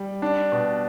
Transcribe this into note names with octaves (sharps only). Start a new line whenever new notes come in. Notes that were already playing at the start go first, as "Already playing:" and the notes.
Already playing: G3
D4
B2